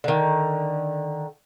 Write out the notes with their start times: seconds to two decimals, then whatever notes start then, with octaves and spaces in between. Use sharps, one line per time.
0.04 D3 D#3